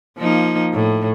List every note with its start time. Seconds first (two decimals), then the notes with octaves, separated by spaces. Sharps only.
0.18 F3 A#3 D#4
0.73 A2